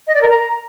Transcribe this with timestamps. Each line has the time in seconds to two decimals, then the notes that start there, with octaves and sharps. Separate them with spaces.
0.07 D#5
0.14 D5
0.21 A#4
0.29 A#5